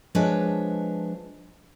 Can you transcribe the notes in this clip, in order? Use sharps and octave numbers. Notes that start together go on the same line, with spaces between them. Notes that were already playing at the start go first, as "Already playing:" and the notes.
F3 G#3 D4 B4 C#5 E5